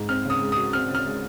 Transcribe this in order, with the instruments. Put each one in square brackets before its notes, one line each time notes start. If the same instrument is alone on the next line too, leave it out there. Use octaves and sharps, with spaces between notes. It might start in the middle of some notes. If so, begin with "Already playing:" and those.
Already playing: [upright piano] G#2
[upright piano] C4 [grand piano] F6
[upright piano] C#3
[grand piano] D#6
[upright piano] G#3
[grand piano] D#6
[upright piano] F#4
[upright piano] C4 [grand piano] F6
[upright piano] C#3
[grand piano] F6
[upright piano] G#3